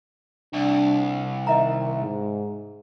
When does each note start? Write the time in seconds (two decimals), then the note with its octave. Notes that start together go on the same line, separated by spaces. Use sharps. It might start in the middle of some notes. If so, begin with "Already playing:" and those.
0.53 C2 D4
1.47 D#3 D#5 E5 A#5
2.02 G#2